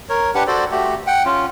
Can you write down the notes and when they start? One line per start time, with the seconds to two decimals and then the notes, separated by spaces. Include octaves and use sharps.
0.10 A#4 C#5
0.35 D4 G4 B4 F#5
0.47 F#4 A4 C5 D5
0.72 A3 F#4 G4
1.07 F#5 G5
1.25 C#4 F4